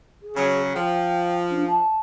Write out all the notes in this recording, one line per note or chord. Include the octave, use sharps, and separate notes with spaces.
G#4
C#3 F#3
F3 G5
D4
A5